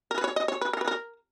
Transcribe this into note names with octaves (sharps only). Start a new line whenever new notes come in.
A#4
B4
C#5
D#5
C#5
B4
A#4
B4
A#4